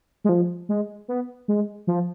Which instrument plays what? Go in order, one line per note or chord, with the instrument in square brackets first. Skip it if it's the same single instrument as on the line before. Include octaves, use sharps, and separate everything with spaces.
[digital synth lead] G#3
F3
G#3
B3
G#3
F3